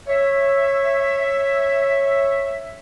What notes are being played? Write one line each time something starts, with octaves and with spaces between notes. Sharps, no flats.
C#5 E5